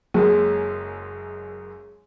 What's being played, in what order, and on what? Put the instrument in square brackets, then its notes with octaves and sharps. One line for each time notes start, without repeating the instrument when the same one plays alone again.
[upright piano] F#1 F#2 [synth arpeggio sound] F#3 A#3 [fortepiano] G#3